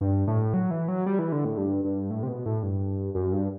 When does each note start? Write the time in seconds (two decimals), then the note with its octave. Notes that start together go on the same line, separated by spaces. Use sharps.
0.01 G2
0.28 A2
0.54 F#3
0.71 E3
0.88 F#3
1.06 G3
1.19 E3
1.32 D3
1.45 A2
1.57 G2
1.84 G2
2.10 A2
2.23 C3
2.28 B2
2.46 A2
2.63 G2
3.15 F#2
3.32 G2